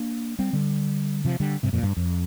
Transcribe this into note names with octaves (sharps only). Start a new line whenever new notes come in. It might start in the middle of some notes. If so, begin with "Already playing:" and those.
Already playing: A#3 D4
G3 C4
D3 G3
C3 F3
D3 G3
G2 C3
F2 A#2
G2
F2